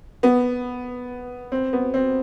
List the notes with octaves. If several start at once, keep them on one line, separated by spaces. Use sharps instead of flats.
B3
C4
B3
C4